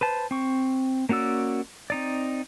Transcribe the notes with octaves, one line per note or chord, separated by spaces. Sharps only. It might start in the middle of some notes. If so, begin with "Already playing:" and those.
B4 C5 A5
C4 C#6
A#3 C#4 F#4 D5 E6
C4 D#4 D5